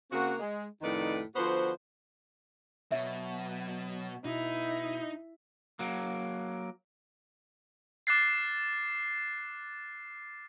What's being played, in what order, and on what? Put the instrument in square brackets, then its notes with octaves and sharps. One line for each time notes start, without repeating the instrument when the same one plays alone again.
[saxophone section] C#3 A#3 C4 F#4
G#3
F2 A2 D#3 D#4 B4 D5
D3 F3 B3 F#4 C5
[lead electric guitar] B2 [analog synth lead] F#3 [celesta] E5
[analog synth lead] B2 [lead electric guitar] D#4 [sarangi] E4
[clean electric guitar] F#3 A#3
[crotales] D6 F6 F#6 A6 C7